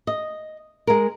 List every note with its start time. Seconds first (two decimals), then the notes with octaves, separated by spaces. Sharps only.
0.07 D#5
0.87 G#3 A#4